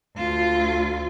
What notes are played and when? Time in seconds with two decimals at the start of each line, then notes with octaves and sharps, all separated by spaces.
0.16 D2 F4